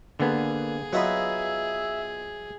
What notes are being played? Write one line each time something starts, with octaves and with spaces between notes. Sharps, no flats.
D3 A#3 B3 G#4
F#3 B3 D#4 F4 B4 E5